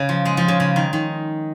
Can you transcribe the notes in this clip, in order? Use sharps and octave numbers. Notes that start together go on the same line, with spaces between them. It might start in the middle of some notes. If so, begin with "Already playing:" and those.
Already playing: C#3
F3
G#3
F3
C#3
C#3
D#3
D#3